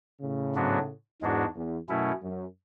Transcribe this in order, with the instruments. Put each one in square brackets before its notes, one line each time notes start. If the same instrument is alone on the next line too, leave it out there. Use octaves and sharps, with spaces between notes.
[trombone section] A2 C#3
[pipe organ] G#2 F#3 B3 D4 F#4
[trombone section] E2 [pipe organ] G#2 G#3 D4 F#4
[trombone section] E2
[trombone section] F#2 [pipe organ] B2 A3 C#4 E4
[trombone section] F#2